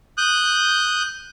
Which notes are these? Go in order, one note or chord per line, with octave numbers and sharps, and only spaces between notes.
D#6 F#6 G6